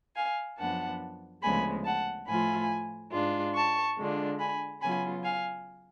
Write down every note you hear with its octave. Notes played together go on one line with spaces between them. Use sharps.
F5 G#5
F#2 F3 B3 D4 F#5 A5
D2 C#3 F3 G#3 B3 G#5 B5
F#5 A5
A2 F3 A3 F4 G#5 B5
G#2 G#3 D4 F4
A5 C#6
D3 G#3 D4 F4
G#5 B5
C#3 F#3 B3 F4 G#5 B5
F5 G#5